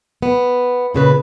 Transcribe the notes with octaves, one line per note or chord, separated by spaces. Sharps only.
B3
A#2 C#3 B4